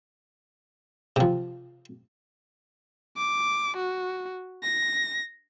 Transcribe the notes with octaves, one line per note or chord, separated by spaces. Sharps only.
C3 F3
D6
F#4
A#6